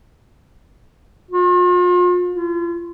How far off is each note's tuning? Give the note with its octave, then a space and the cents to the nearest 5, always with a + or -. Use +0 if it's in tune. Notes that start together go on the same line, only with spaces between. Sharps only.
F4 +40
F4 -40